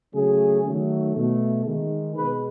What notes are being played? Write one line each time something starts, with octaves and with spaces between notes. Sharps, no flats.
C#3 F#3 A3 G#4
D#3 F#3 A3
B2 A3
D#3 G#3
B2 G#3 B4